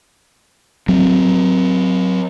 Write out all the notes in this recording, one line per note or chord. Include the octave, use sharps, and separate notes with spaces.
F#3 C4